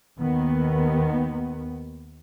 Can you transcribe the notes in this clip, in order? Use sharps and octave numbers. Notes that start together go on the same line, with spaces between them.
D#2 D#3 B3